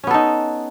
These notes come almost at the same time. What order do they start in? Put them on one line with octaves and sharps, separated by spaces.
C#4 B3 A4 D#4